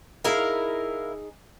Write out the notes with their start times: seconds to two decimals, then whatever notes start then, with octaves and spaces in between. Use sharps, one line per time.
0.24 D#4 E4 G#4 A#4 F5